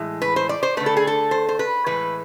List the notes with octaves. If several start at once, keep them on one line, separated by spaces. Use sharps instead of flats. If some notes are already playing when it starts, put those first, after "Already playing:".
Already playing: A2 E3 G#3
B4
C5
D5
C5
D3 A3 B4
A4
G#4
A4
C5
C5
B4
A2 E3 G#3 B4